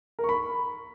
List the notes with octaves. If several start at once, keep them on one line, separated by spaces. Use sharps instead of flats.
A#4
C#6
B5